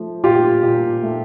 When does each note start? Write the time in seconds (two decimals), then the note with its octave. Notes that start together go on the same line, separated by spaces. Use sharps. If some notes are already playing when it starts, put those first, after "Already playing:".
Already playing: F3 A3
0.24 A#2 F4 G4
0.63 A#2
1.03 A3